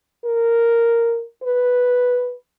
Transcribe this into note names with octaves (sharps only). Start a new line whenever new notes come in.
A#4
B4